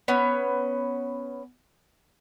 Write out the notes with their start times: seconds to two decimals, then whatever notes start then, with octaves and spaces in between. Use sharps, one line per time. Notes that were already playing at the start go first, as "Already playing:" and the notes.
0.08 B3 C#4